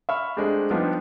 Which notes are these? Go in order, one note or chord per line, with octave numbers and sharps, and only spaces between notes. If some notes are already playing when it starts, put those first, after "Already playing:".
E5 F5 B5 C#6 F6
G#3 A3 C4 D4 G4
F3 G3 B3 D4 D#4 G4